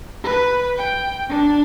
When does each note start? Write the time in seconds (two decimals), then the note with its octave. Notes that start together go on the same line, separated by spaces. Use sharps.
0.23 B4
0.76 G5
1.29 D4